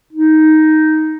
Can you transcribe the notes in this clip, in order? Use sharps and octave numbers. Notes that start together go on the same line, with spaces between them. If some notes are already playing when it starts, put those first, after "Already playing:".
D#4